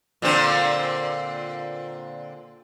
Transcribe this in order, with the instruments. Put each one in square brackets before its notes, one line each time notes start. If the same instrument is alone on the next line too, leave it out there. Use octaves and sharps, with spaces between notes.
[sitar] A#2 D3 C4